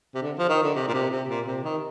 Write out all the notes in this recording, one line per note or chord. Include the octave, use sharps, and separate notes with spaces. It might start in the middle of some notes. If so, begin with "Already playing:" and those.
C3
D3
F3
D#3
D3
C3
A#2
C3
C3
A#2
C3
D#3